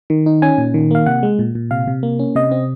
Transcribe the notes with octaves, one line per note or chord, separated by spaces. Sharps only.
D#3
D#4
C#4 G#5
A#2
D#3
A#3 F5
C3 F#5
G#3
A#2
A#2
C3 F5
C3
A#3
C#4
C3 D#5
C4